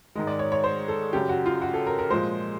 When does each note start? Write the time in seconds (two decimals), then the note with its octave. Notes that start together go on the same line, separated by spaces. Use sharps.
0.15 G#2 D#3 G#3 D#5
0.27 D5
0.39 C#5
0.52 C#5
0.64 C5
0.88 A4
1.13 F#2 C#3 F#3 G4
1.29 F#4
1.46 F4
1.62 F#4
1.74 A4
1.86 A#4
1.99 A#4
2.10 A#2 F3 G#3 C5